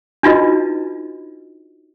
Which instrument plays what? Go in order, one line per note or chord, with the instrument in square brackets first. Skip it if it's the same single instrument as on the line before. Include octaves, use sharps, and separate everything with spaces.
[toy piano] D4 D#4 F4 F#4 B4 D#5